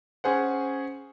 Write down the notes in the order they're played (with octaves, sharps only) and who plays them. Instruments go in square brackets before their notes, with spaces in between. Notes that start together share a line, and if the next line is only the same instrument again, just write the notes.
[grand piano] C#4 G#4 C5 F#5